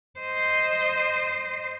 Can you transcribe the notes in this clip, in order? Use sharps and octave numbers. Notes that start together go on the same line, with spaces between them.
C5 D#5